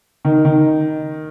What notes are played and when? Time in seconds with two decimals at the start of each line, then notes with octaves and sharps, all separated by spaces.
0.25 D#3
0.45 D#3